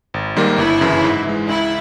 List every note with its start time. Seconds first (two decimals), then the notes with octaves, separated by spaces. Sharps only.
0.14 G#1
0.36 G#2 D#3 G3 A#3
0.58 G1 E4
0.81 F#2 C#3 E3
1.04 G#2
1.26 E3 G#3
1.48 C#2 E4